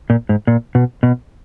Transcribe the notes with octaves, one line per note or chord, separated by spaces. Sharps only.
A#2
G#2
A#2
B2
B2